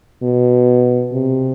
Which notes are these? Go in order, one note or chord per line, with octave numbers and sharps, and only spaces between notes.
B2
C3